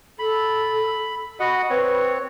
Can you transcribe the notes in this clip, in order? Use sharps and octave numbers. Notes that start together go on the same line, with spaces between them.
A4 B5
F#4 D#5 F#5 B5
C4 B4 C#5